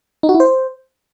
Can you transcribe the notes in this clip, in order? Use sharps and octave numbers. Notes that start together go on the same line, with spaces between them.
D#4
F#4
E4
C5